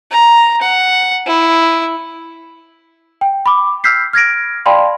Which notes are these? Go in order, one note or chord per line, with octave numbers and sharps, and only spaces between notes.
A#5
F#5
E4
G5
B5 D6
E6 F6 G6 B6 C7
F6 G#6 A#6 D7
D5 F5 G5 A5 B5 C6